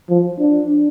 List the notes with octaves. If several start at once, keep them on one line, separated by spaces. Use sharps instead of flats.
F3
D4